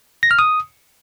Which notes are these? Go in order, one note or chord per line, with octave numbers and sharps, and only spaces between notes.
A#6
F6
D#6